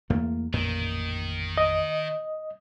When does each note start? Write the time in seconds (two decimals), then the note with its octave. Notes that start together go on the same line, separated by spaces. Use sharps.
0.10 E2 A3 A#3
0.54 A1 F2 A#2 D#3
1.58 D#5